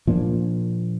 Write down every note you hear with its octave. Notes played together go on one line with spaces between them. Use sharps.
A#2 F3 A#3 D4